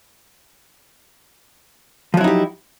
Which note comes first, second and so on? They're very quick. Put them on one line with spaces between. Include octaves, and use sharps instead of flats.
F3 F#3 E4 D#4 G4